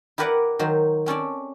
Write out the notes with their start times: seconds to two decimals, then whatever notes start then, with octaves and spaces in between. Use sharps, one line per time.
0.18 E4 G4 A#4 B4 D5 F#5
0.59 D#3 F#3 C5
1.06 C4 C#4 A4 D5